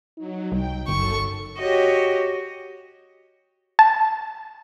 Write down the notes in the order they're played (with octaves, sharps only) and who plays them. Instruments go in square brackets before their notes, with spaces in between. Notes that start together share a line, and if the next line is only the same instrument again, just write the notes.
[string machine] F#3 [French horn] D#4
[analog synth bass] C2 [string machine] G5
[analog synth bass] G1 [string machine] F#2 A4 [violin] C#6
[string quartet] F#4 G4 C#5 D#5
[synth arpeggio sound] A5